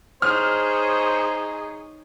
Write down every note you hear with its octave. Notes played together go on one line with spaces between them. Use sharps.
D#4 G#4 C5 C#5 F6